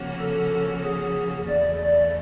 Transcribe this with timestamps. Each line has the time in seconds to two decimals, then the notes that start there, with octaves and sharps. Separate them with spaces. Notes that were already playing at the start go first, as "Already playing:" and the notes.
Already playing: C#3 F3 A#3 C#4 F#4
0.20 A4
0.84 G#4
1.48 E2 C#3 E3 A3 D5
1.81 D5